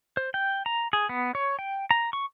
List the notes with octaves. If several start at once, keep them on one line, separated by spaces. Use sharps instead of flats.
C5
G5
A#5
G#4
B3
C#5
G5
A#5
C#6